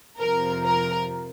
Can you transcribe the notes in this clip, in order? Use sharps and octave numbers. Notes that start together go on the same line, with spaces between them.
F2 C3 F3 A#4
A#4